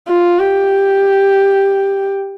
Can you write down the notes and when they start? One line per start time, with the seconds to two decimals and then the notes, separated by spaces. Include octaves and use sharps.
0.08 F4
0.39 G4